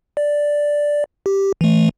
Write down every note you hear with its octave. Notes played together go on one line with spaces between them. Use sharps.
D5
G4
E3 A3